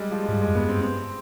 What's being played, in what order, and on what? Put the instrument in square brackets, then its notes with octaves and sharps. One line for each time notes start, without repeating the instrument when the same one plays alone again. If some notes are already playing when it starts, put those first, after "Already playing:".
Already playing: [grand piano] G3 G#3
F3
G#3
[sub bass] G#2 [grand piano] G3
[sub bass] G2 [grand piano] G#3
[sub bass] F2
[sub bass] G2 [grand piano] B3
[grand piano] C4
C4